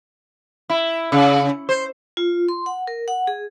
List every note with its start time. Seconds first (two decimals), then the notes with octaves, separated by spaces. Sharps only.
0.70 E4
1.12 C#3
1.69 C5
2.17 F4
2.49 C6
2.66 F#5
2.87 A#4
3.08 F#5
3.27 G#4